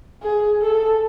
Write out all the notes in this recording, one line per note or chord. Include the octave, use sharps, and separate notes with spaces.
G#4
A4